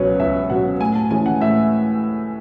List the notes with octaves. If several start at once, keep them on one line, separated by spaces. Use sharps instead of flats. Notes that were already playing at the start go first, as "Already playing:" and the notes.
Already playing: C#2 B2 F#3 C#4 B4 C#5
C#2 E5
B2 F#3 C#4 F#5
A2 G#5
A5
E3 G#3 C#4 G#5
F#5
A2 E5